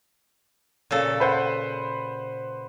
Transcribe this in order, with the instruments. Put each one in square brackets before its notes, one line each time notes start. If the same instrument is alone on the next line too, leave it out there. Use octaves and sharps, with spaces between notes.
[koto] A#2 C#3 A4
[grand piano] B4 C5 F#5